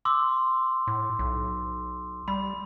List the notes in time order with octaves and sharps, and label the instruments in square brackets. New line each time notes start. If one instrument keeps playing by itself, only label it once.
[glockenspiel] C6 D6 E6
[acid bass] A2
B1
[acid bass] G3 [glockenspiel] B5